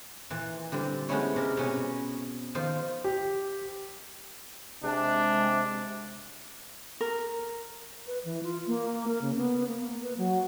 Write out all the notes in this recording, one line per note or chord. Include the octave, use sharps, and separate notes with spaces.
A#2 E3
D3 G3 C4
G#3 A3 B3 C#4 E4 C#5
C3 A#4
B2 C#4 G#5
D#3 F3 C5
G4
C3 G#3 D4
A#4
B4
E3
F4
A#3
A#4
C#3
B3
A#3
B4
F#3